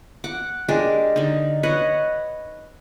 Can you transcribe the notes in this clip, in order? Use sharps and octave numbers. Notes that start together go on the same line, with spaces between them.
F#5 D6
G#3 D4 G4 A#4
D3 D#4
B4 C#5 D#5 F#5